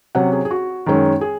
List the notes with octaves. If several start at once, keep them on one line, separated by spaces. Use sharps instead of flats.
C3 F#3 C#4 F#5
G#4
G#4
F#4
F#2 D#3 G#3 C#4
G#4